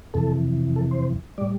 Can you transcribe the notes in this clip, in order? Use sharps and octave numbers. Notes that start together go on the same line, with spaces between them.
F2 C3 E3 A4
A4
C5
A2 G3 D5